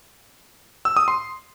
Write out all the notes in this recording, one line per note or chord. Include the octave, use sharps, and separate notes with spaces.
E6
D#6
C6